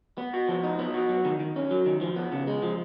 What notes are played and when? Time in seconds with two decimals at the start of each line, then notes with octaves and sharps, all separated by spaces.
0.18 B3
0.34 F#4
0.49 F3
0.63 D#4
0.79 B3
0.94 F#4
1.09 F#3
1.25 D#3
1.40 D#3
1.56 C#4
1.71 F#3
1.86 D#3
2.01 F3
2.16 B3
2.32 C#3
2.47 G#3
2.62 F3